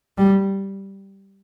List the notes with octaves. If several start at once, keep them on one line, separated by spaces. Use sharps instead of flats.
G3